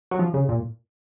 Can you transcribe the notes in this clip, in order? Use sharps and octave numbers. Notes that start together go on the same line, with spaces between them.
F#3
F3
C#3
A#2